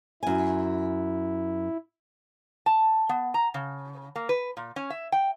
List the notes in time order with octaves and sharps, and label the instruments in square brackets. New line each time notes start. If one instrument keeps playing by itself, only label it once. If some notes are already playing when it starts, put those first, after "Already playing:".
[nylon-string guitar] F#2 G#5 [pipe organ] E4
[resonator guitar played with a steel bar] A5
B3
A#5
C#3
A#3
B4
A#2
C#4
E5
G5